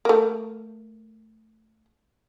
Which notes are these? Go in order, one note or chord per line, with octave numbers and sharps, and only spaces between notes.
A3 A#3